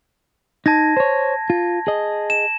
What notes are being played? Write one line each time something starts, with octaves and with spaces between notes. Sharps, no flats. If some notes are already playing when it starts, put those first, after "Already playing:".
D#4 A5 G#6 A#6
C5 C#5
F4
G#4 D#5
E7